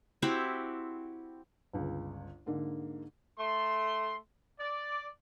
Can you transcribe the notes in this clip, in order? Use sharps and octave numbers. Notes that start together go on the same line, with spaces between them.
C4 E4 F#4 G4
G1 C#2
G#2 D3 A#3 D#4
A3 C6
D5